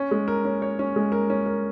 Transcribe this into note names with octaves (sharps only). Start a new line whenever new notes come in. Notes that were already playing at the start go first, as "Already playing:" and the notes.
Already playing: C#4
G#3
A#4
C#4
C#5
C#4
G#3
A#4
C#4
A#4